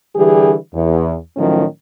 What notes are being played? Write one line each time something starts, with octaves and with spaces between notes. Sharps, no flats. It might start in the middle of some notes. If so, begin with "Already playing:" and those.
D3 E3 G3 G4 G#4
E2
A2 D#3 F3 F#3 C#4